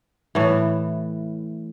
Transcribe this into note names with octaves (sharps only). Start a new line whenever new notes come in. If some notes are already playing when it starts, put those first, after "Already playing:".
A2 E3